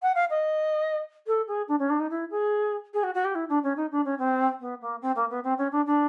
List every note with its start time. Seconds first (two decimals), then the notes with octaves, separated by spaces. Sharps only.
0.02 F#5
0.15 F5
0.30 D#5
1.27 A4
1.47 G#4
1.68 D4
1.79 C#4
1.89 D4
2.00 D#4
2.10 E4
2.30 G#4
2.94 G#4
3.03 F#4
3.14 F#4
3.24 G4
3.35 E4
3.49 D4
3.63 C#4
3.76 D#4
3.91 D4
4.05 C#4
4.18 C4
4.60 B3
4.81 A#3
5.01 C4
5.15 A#3
5.30 B3
5.44 C4
5.58 C#4
5.72 D4
5.86 D4